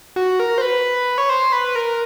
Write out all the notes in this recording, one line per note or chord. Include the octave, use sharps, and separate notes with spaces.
F#4
A#4
C5
B4
C#5
C5
B4
A#4